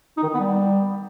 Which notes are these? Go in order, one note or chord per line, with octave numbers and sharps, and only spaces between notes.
D#4
D#3
D#4
B3
G3